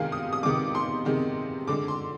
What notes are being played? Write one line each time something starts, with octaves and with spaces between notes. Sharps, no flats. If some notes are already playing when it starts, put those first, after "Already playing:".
Already playing: C3 D#3 G#3 F5 G5 G#5
D#6
D#6
C3 D#3 G#3 D6
C6
C3 D#3 G#3
D3 G#3 D6
C6